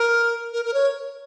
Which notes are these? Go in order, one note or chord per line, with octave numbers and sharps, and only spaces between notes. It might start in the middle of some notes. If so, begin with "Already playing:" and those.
Already playing: A#4
A#4
A#4
C#5